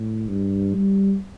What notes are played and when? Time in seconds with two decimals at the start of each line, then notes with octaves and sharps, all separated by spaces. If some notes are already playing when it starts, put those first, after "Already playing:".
Already playing: A2
0.28 G2
0.74 G3